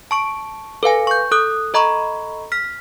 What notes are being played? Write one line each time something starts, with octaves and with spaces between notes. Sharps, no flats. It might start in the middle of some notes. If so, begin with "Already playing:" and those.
A5 C#6 D7
A4 B4 F5 G#5
C#6 G6
A4 D#6 F#6
A4 D#5 A#5 B5 C#6
F6 B6